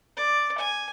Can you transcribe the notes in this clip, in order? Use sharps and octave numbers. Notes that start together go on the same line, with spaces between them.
D5
G#5